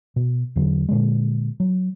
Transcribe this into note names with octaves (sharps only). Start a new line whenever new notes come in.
B2
E2 D3 F#3
A#2 D3 G#3
F#3